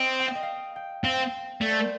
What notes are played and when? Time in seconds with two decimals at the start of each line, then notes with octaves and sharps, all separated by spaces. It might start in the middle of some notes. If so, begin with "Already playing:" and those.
Already playing: C4 D#5
0.20 G5
0.27 F5
0.35 D#5
0.43 F5
0.76 G5
1.04 C4 F5
1.14 G5
1.23 F5
1.61 A3 D5
1.71 C5
1.80 A#4